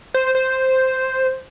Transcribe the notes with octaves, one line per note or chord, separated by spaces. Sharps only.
C5
C5